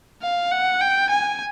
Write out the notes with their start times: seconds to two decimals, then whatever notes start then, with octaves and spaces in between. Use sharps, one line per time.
0.22 F5
0.52 F#5
0.81 G5
1.10 G#5